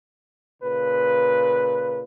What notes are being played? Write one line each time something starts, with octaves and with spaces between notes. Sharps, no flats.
A#2 C#3 B4